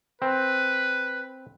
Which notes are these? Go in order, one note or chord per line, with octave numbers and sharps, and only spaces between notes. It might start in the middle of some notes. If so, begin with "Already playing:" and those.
C4 B4